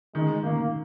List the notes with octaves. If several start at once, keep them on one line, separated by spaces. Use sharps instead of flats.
D#3 G#3
D#3 A#3